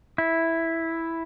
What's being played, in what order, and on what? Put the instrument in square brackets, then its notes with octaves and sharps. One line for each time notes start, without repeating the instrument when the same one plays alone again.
[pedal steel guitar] E4